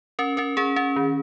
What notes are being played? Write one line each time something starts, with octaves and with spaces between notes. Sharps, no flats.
C#4 A#4
C#4 A#4
C#4 G#4
C#4
D#3